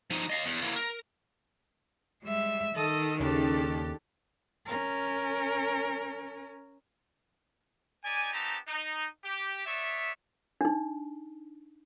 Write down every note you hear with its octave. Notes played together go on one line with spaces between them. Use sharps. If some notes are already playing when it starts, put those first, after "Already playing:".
F3 D#4
D#5 F5
E2
A#3 E4
A#4
G3 G#3 E5
D#3 A4 D#5 D#6
D#2 C#3 D4 G4 A4
C#4 A#4
D#4 G4 D5 G#5
B3 C4 D#4 G4 A5 A#5
D#4
G4
B3 C#5 D5 E5
D4 D#4